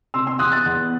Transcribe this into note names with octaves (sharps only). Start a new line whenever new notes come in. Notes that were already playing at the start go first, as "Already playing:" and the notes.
C3 C6 E6
C6 E6
E2 D#6 F#6
F#6 A6
E2